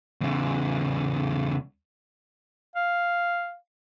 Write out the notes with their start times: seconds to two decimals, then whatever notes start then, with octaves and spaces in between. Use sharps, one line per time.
0.21 E2 C#3
2.76 F5